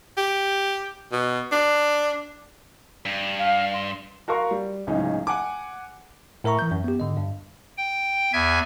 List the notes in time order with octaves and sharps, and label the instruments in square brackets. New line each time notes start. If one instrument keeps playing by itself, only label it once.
[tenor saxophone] G4
B2
D4
[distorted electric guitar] G2
[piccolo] F5
C6
[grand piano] F#4 A#4 F5 C6 C#6
G3
D1 C#2 C#4 D#4
F#5 G#5 D6
[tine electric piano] A2 A#4 E5 A#5 C#6
E3 G6
F#2
B3 G4
G#2 D3 D#5
G2
[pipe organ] G5
E2 E5 G#5 G#6